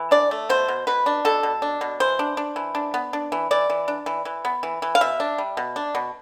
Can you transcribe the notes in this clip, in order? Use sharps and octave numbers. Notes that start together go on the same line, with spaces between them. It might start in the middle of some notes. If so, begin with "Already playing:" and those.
Already playing: E3
D4 D5
A3
B2 C5
B2
B2 B4
D4
B2 A4
B2
D4
B2
E3 C5
D4
D4
E3
D4
B3
D4
E3
E3 D5
E3
D4
E3
E3
B3
E3
E3
F5
B2 E5
D4
G3
B2
D4
B2